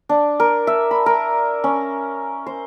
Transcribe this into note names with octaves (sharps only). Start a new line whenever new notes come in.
D4
A#4
E5
B5
A#4
C#4
C5